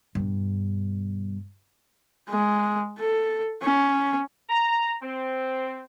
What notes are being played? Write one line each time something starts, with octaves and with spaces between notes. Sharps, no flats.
G2 B2
G#3
A4
C#4
A#5
C4